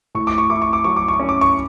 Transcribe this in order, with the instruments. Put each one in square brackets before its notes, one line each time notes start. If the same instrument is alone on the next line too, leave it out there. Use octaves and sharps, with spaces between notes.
[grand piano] A2 C#6
D6
C#6
E4 D6
C#6
D6
F#3 C#6
D6
C#6
C#4
D6
C#6